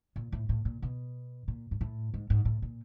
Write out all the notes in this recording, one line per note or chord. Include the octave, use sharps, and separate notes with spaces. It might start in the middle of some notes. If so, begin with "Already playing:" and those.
A#2
A2
A2
A#2
B2
A#2
G#2
A2
G#2
G#2
A2
A#2